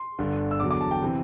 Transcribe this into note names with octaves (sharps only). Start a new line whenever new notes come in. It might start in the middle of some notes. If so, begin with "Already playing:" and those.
Already playing: C6
G1 G2 D3
E6
E2 D3 F#3 D6
D6
A5
G5
C3 E3